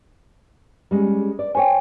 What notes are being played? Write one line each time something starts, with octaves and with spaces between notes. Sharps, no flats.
G3 G#3 C#4
D5
C5 C#5 G5 G#5